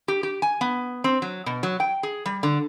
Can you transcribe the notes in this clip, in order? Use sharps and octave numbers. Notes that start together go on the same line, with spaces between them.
G4
G4
G#5
B3
C4
F#3
B2
F#3
G5
G#4
G3
D3